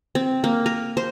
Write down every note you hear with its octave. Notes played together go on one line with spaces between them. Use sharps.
C4
A#3
A#4
C5